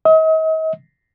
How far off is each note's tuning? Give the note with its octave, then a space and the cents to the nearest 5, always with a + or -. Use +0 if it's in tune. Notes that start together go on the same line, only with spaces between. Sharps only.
D#5 +40